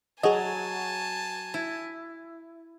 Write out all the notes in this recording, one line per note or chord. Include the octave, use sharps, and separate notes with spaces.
F#3 G#4 D#5 G#5 A5
E4